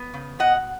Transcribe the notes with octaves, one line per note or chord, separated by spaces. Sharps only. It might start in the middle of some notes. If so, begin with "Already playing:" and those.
Already playing: B3
C#3
B2 D#5 F#5